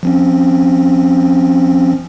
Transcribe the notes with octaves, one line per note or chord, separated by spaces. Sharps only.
F3 C4 C#4